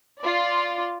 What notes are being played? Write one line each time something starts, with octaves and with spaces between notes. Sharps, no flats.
F4 D5